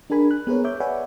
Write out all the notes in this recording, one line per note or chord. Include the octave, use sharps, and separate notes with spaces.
D4 G#4 A#4 G#5 B5
F#6
B3 G#4 A#4 B4 C#5
C#5 E5 D6 G6
B4 C#5 D5 E5 F#5 G#5